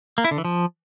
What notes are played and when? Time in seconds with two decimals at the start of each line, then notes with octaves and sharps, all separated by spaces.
0.18 A#3
0.25 E4
0.31 D3
0.38 E3
0.45 F3